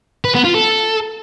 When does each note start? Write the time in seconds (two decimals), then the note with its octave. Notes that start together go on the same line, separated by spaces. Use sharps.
0.25 B4
0.35 B3
0.45 F4
0.55 A4